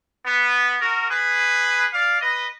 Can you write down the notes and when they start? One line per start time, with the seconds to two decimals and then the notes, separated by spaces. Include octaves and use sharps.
0.25 B3
0.80 F#4 A#4
1.09 G#4 B4
1.93 D5 F5
2.21 B4 D#5